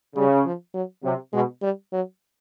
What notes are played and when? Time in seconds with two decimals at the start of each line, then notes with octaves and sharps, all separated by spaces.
0.15 C#3 G3
0.45 F3
0.74 F#3
1.04 C3 F#3
1.33 B2 G#3
1.62 G3
1.92 F#3